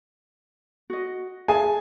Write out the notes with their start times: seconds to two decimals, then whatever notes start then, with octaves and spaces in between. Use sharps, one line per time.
0.90 F#4 D#5
1.48 G#4 E5 G#5 A5